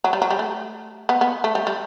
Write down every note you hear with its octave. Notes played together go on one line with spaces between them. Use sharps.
F#3
G3
F#3
G3
A3
B3
B3
A3
G3
G3